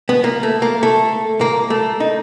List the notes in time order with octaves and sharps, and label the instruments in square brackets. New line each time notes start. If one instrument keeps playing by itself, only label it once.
[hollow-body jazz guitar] B3
A#3
A3
A#3
A3
A#3
A3
D#4